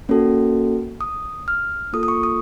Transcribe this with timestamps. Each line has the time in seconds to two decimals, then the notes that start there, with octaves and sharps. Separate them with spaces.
0.09 A#3 C#4 F#4 A4
1.01 D#6
1.48 F6
1.93 A#3 F4 A4 D#6
2.03 D#6
2.08 C#6
2.23 D#6